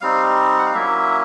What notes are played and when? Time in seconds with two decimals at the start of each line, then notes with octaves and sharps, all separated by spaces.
0.01 G3 C4 D#4 F5
0.59 F#5
0.66 F5
0.73 F#3 A#3 C#4 E4 E5